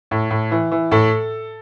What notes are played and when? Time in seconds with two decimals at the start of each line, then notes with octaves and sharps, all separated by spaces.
0.11 A2
0.30 A2
0.51 E3
0.72 E3
0.91 A2 A4